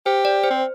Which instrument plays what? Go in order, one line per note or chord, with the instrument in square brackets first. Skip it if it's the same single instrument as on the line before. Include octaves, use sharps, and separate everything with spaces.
[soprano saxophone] G4 [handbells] C5
[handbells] D5
C5
[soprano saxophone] C4